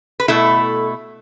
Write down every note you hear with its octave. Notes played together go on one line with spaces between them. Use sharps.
B4
B2 A3 E4 A4